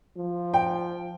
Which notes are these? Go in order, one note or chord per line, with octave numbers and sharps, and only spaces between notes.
F3
G5